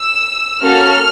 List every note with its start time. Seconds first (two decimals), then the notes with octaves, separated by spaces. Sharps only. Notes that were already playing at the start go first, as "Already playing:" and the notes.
Already playing: E6
0.61 A#3 C#4 F#4 A4 F6